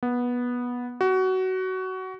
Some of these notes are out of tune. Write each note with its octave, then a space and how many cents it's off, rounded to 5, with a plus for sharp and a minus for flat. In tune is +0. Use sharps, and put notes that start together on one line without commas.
B3 -15
F#4 +20